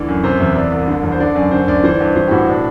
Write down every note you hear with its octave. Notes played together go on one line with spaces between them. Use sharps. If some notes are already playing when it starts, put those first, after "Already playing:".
Already playing: D2 E3 D5
F#2
C3 C5
E2 E5
C3 D5
C2
D3
E2
C5
D3 D5
F#2 D5
D3 C5
D2 D5
E3 C5
D5
G2
C5
E3 C5
G4
A2 F#4
B2 D4